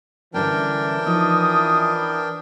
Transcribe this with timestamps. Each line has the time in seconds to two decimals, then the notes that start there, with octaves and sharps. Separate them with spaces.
0.34 D3 E3 G3 C#4 D4 A#4 G5
1.06 F3 D#4 D#6